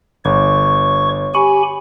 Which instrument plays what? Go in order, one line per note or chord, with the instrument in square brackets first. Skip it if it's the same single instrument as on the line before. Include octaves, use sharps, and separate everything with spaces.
[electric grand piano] G1 [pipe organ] C#5 C#6
[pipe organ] G4 G#5 B5 [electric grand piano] C#6